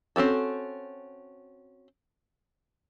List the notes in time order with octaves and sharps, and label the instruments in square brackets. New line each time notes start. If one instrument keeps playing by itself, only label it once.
[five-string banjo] C4 C#4 F#4 A4